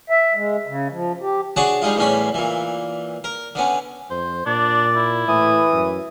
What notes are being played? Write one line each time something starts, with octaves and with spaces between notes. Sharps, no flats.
E5
G#3
C#3
F3
G4
D4 F#4 G#4 C#5 F#5 A5
G3 G#3 D#4 F4
E2 A2 G3 C#4 C#5 B5
A#2 E3
A#4
D3 B3 C#4
F2 C5
A#2 D4 D5
E4
A2 E3 D#6
F#2